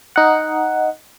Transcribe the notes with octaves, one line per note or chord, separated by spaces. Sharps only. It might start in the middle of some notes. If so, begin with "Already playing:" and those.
D#4 F#5